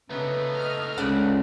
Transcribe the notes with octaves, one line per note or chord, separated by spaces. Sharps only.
C#3 A3 B3 D#4
D#5 F6
C#2 C#3 D5 F#5